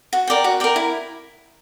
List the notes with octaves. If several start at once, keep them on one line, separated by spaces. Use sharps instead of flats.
F#4
A#4 D5 G5
F#4
A#4 D5 G5
E4